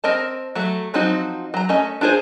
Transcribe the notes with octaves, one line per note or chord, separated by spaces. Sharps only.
C4 A#4 D#5 A5
F#3 A3
F3 F#3 C4 D#4 F#4
F#3 A#5
A3 C#4 D#5
D4 F4 G#4 A#4 C5